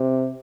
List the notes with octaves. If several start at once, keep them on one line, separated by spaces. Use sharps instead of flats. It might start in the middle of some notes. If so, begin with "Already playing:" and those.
Already playing: C3